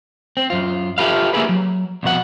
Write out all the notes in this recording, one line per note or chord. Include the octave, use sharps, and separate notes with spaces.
C4
F#2 F4
F4 G4 A4 B4 E5 F5
A#3 D#4 E4 G4 G#4 B4
F#3
C2 F2 B2 F#5